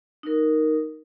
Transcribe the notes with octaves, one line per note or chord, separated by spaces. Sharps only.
D#4 A#4